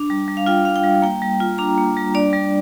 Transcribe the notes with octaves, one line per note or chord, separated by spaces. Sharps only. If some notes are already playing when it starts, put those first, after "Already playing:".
Already playing: D4
G3
G3
F5
F4 G5
D4 F5
G5
G3
A#3 G5
G3
F4
D4 A#5
A#3
G3
D4 D5
G3